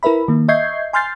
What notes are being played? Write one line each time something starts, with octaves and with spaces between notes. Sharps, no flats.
E4 A#4 B4 E5 B5
D#3 A#3
D#5 E5 C#6 G6 G#6 C7
G#5 C6 F6 G6 A6 C7